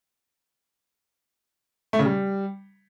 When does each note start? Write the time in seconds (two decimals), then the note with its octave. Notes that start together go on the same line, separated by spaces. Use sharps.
1.93 A3
1.99 C#3
2.05 G3